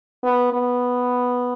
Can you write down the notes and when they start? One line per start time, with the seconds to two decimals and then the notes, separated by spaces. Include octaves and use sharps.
0.23 B3
0.53 B3